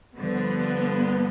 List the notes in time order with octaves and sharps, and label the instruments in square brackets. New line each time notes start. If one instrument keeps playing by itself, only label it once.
[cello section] G2 D3 F3 [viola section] B3